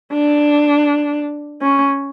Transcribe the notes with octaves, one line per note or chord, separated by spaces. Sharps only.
D4
C#4